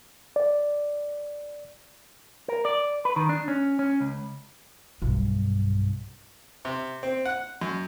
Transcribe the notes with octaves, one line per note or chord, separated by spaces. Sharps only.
D5
A#4
D5
B4
D#3
D4
C#4
C#4
C#2
B1 G2
C3
C4
F#5
F#2